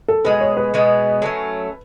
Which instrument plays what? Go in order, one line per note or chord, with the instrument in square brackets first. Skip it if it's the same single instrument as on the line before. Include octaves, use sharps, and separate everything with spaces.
[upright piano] A4
[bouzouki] B2 G#3 B3 [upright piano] B4
[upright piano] C#5
B4
[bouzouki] B2 G#3 B3
F#3 A3 C#4